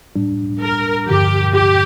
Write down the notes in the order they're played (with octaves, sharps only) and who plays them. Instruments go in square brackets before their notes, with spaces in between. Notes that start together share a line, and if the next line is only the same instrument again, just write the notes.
[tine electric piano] A2 G3 D4
[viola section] A#4
[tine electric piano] G2 D3 F3 [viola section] G4
[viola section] G4